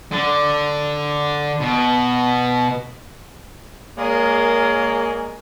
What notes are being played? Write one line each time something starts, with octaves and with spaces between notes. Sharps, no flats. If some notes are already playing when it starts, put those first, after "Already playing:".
D3
B2
G#3 A#3 G#4 A#4 C#5 D5